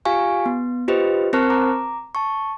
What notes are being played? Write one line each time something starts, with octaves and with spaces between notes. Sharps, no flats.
F4 G4 F5 G#5 C#6
B3
F4 G4 B4 C5 D#5
C4 A#4 C5 A5 C#6 F6
A#5 D6
A5 C#6